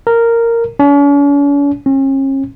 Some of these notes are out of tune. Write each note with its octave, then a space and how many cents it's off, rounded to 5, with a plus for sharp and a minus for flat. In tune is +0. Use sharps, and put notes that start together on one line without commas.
A#4 -10
C#4 +45
C#4 -40